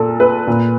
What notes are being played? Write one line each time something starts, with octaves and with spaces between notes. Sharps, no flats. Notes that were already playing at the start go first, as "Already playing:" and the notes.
Already playing: A#2 A4
B4
A#2